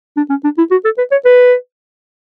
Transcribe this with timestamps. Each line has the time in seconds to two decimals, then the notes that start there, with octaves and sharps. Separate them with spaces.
0.17 D4
0.30 C#4
0.44 D4
0.58 E4
0.71 F#4
0.85 A4
0.98 B4
1.12 C#5
1.25 B4